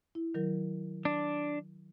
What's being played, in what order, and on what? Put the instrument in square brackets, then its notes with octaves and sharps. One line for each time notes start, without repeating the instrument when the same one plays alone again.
[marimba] E4
D#3 F#3 A#4
[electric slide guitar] D4